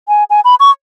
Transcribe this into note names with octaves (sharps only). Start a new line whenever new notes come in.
G#5
G#5
B5
C#6